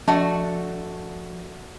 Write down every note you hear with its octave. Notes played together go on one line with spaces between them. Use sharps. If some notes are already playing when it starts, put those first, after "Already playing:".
F3 A3 D4 F#4 A5